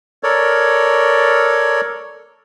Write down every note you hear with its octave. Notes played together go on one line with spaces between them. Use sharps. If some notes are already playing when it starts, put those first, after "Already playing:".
A4 A#4 C#5 D5